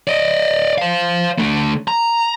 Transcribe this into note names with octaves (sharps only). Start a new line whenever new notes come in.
D5 D#5
C5 F5
D3 A3
A#5